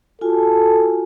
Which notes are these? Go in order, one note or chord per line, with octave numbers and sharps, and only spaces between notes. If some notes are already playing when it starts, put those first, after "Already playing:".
F4 F#4 A4 G#5